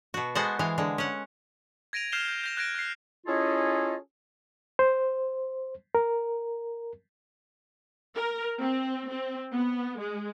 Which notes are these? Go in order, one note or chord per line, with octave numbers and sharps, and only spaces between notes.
B2 F#4
G#3 B3 F#4 A4 C5 F#5
E3 G#3 F5
D3 G#3
C#4 F#5
G#6 A#6 D7 D#7 F7
F6 G6 C7 E7 F7 G7
G6
G6 A#6 F7
F#6 G#6 A#6 D7
F#6 C7
C#4 E4 F4 G#4 A4 D#5
C5
A#4
A#4
C4
C4
B3
G#3